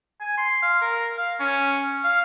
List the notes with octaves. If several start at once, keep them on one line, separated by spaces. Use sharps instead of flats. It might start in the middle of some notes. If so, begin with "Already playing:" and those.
G#5
C6
F5
A#4
F5
C#4
F5